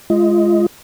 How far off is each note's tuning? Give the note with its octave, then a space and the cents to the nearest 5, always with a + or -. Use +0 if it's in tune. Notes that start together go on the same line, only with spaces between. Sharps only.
G#3 +10 F4 -20 D#5 +15